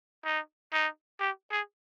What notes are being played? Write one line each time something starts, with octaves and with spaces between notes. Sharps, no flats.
D#4
D#4
G4
G#4